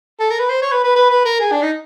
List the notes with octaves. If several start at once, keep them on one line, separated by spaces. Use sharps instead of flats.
A4
A#4
B4
C5
C#5
B4
B4
B4
B4
A#4
G#4
D4
D#4